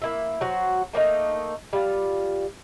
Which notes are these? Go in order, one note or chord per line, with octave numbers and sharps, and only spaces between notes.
A#3 E4 E5
F#3 F#4 C5
A3 A#3 C4 D#4
G3 F4